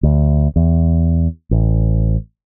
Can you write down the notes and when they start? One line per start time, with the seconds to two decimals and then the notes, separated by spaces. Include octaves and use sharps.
0.03 D2
0.56 E2
1.51 A1